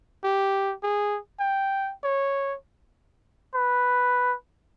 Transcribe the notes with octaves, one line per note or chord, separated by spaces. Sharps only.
G4
G#4
G5
C#5
B4